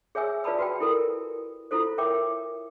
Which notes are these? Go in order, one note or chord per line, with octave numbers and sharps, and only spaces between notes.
G#4 C#5 E5 G#5 E6
F4 B4 D5 A5 B5 E6
F#4 B4 G5
E4 A4 A#4
E4 F4 A4 C5
A#4 C#5 E5 G5 D6